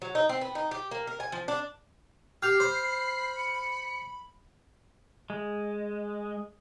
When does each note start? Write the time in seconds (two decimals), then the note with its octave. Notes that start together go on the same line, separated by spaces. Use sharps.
0.02 F#3
0.15 D#4
0.29 C4
0.41 B3
0.55 D#4
0.71 G4
0.91 A#3
1.07 A#4
1.20 G#5
1.32 F3
1.48 D4
2.42 G4 F6 G6 C7 F7
2.60 C5 B5
3.36 C#7
5.30 G#3